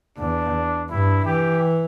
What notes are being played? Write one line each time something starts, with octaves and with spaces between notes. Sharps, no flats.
E2 D4
G2 E4
E3 G4